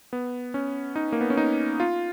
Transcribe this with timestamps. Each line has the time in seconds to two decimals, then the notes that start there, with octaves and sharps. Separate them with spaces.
0.13 B3
0.54 C#4
0.96 D#4
1.12 A#3
1.21 B3
1.30 C#4
1.37 D#4
1.80 F4